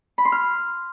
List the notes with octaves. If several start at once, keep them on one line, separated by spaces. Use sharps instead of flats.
B5
C6
F6